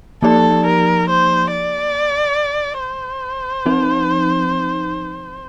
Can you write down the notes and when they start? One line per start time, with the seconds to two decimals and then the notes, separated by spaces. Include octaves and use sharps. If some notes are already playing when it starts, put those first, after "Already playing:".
0.22 F3 A#3 D#4 G4 A4 D5
0.65 A#4
1.09 C5
1.52 D5
2.80 C5
3.66 F3 C4 D#4